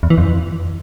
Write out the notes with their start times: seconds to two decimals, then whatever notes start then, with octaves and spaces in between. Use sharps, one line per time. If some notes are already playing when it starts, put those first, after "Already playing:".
0.03 E2
0.10 E3
0.18 F2